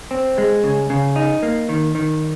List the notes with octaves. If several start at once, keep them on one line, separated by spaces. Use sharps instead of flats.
C4
G#3
C#3
C#3
D#4
A#3
D#3
D#3